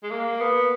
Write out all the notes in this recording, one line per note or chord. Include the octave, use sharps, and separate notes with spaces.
G#3
A#3
B3